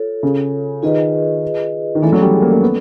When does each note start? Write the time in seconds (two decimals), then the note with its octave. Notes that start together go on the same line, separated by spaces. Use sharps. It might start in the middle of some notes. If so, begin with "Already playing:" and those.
Already playing: F4 A4 C#5
0.23 C#3
0.83 D#3 F4 G#4 B4 D#5
1.95 D#3
2.02 E3 A3 C#4 F#4 A4 D5
2.12 F#3
2.22 G3
2.32 G#3
2.42 A#3
2.52 A#3
2.62 B3